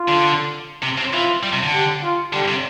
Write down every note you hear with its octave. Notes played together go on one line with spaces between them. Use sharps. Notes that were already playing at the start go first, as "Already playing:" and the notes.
Already playing: F4
D3
C3
C3
E3 F4
G3
C3
D3
G4
F4
D3 G3
C3